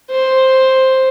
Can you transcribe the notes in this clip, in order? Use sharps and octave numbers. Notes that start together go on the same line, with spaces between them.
C5